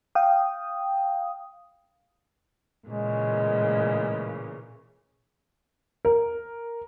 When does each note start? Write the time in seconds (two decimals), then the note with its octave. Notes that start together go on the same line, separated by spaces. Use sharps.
0.15 F5 G5 D#6
2.88 A#2 C#3 E3 G#3
6.05 A#4